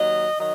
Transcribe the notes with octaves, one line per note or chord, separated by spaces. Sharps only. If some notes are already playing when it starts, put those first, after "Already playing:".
Already playing: D#2 D#3 F#3 D#5
D#3 F#3 D#5